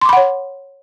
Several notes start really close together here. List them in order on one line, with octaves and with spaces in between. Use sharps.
C6 D6 B5 F#5 C#5